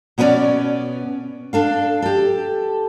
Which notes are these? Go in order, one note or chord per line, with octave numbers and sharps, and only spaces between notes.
B2 B3 C#4 A#4 C#5 D5
D4 A4 F5
G4 A4